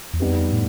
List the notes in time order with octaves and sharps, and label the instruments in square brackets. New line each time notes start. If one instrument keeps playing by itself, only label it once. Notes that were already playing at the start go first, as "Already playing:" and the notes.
[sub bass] E2
[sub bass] F2 [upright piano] G3 B3 D#4 G4 B4
[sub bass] A2